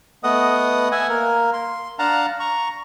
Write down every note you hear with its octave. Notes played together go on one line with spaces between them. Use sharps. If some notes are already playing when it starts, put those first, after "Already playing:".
A3 B3 D#5 F#5 D#6
E5 F#5 G#5
A#3 A#4
C6
D4 F5 F#5 A5 A#5
A#5 C#6